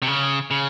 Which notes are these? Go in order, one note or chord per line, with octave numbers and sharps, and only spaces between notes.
C3
C#3
C#3